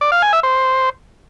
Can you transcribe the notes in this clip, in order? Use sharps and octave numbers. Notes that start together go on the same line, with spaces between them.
D5
F5
G#5
E5
C5